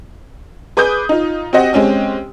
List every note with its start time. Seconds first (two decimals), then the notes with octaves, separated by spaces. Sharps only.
0.77 G#4 B4 D6 D#6 G6
1.09 D#4 F4
1.53 C4 F#4 G4 C5 D#5 F#5
1.73 G#3 C4 C#4 G4